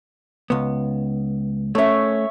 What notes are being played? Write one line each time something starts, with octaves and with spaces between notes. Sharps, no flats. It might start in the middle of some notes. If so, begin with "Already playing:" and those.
C#2 B3
A3 C#4 C#5 E5